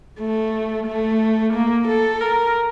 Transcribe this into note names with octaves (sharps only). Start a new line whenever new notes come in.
A3
A3
A#3
A4
A#4